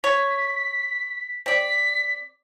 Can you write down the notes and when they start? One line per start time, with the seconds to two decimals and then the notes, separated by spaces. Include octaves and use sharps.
0.04 C#5 B6
1.46 C4 D5 B6